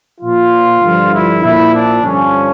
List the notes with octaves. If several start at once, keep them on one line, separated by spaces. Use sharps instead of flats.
A#2 F3 F4
G2 D3 F3
E4
A#2 F3 E4
D4
G2 D3 F3 C#4